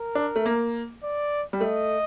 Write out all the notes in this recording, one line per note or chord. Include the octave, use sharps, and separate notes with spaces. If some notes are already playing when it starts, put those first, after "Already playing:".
Already playing: A#4
D4
A3
A#3
D5
G3
A3 D#5